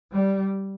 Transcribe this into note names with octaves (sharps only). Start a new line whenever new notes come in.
G3